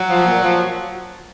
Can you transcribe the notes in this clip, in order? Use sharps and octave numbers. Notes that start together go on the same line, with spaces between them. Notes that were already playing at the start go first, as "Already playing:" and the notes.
Already playing: F#3
F3
A#2
F3